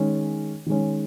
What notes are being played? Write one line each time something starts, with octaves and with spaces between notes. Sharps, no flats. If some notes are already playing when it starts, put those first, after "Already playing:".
Already playing: D#3 G#3 C#4
D#3 G#3 C#4